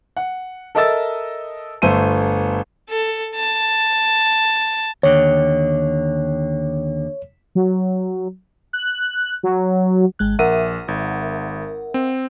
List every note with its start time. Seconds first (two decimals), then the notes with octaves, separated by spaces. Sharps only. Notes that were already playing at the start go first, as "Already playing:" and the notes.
0.17 F#5
0.75 A4 A#4 D#5 E5 E6 A6
1.82 G1 A3 A4 C5 E5 D#7
2.89 A4
3.35 A5
5.03 D#2 D3 C#5
7.55 F#3
8.73 F#6
9.43 F#3
10.19 G#1 G#3 F#6
10.39 A#1 A#4 E5 F#5 D#7
10.88 G#1
11.94 C4